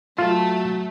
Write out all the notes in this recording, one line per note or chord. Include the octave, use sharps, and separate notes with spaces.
F#3 A3 F4